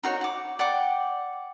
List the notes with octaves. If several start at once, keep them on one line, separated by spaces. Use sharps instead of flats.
D#4 F#4 C#5
F#5 D6
D5 F#5 G5 D6